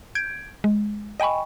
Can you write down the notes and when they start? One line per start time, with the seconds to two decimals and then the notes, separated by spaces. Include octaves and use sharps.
0.15 G6 G#6 D7
0.64 G#3
1.20 D#5 G5 G#5 B5 C#6